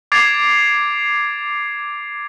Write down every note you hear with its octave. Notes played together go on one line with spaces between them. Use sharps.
D6 G#6 A6 C7 D7 F7